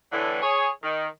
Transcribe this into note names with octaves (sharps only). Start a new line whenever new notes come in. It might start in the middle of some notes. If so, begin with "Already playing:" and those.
A2 D3 E3
G#4 C#5
D#3